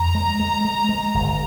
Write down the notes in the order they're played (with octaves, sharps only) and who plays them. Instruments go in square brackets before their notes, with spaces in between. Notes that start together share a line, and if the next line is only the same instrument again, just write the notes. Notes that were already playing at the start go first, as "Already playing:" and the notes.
Already playing: [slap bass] F2 [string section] A#5
[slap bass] G#3
G#3
G#3
G#3
G1